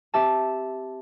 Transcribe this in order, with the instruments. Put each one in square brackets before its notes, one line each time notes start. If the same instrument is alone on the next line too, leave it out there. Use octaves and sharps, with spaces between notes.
[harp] C4 G4 E5 A5